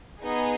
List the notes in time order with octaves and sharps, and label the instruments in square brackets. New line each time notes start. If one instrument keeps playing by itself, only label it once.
[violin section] B3 D#4 G#4